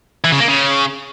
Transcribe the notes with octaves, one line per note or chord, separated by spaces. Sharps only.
E3
C#3
A#3
C#3